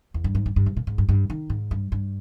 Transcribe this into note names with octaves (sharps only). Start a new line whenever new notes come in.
E2
G2
G#2
G2
G2
G#2
A#2
G#2
G2
G2
D#3
G#2
G2
G2